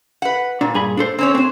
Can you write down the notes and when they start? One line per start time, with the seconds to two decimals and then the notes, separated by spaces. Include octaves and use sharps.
0.22 B4 F#5
0.61 A#2 D4
0.74 G2 G#4 B5
0.97 D4 A4 C5
1.19 C4 C#4 C#5
1.35 C4 D4 C5